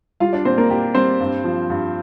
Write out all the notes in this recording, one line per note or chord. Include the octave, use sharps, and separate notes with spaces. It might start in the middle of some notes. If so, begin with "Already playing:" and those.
G3 F4 F5
D4 D5
A#2 C4 C5
A#3 A#4
A#2 G4
G3 C4 C5
G2
F3
G2